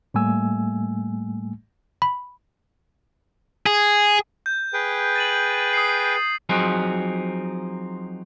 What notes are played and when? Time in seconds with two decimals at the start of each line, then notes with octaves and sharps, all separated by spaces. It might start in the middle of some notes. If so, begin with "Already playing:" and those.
0.14 A2 G3 A3 A#3 G#5 E6
2.02 B5
3.66 G#4
4.46 G6
4.73 G#4 B4 G5
5.16 A6 D#7 F#7
5.73 D#6 C7
6.49 F3 F#3 C4 D#4 G#4